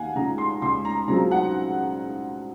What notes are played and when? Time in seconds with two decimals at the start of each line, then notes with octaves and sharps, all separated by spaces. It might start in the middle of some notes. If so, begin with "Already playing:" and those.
Already playing: D#2 F5 F#5 G#5
0.15 C#3 F3 G#3 A#5
0.38 C6
0.62 C#2 C6
0.85 A#5
1.08 C#3 F#3 C4 F4 A#5
1.31 F#5